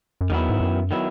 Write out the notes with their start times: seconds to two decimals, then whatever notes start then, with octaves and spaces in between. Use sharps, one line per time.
0.21 F#2
0.30 E2 D#3 F#3 B3 E4
0.49 G#2
0.61 F#2
0.91 D#3 F#3 B3 E4